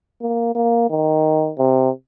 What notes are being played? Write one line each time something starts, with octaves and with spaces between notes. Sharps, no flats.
A#3
A#3
D#3
C3